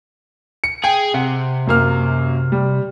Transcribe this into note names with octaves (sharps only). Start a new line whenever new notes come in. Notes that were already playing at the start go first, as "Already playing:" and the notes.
C#7
G#4 G5
C3 F#5
F#2 A#3 F6
G3